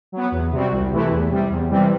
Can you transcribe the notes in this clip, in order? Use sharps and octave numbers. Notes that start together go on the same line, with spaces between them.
F#3 B3
E2
C3 G3 C4 F#4
C2
C3 E3 A3 E4
E2
C3 G3
E2
C3 E3 G3 C4